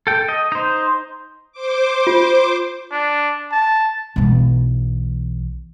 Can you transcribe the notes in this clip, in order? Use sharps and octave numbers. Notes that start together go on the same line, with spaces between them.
A4 G5
D#5
D#4 C5
C5 D6
F4
D4
A5
B1 E3